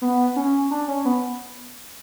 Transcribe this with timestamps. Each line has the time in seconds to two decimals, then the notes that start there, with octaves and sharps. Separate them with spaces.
0.02 B3
0.36 C#4
0.71 D4
0.88 C#4
1.05 B3